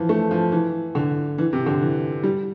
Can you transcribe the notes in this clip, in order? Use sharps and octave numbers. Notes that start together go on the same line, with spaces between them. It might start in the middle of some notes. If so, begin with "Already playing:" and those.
Already playing: E3 F3
A3
F3
E3
D3
E3
C3
D3
E3
G3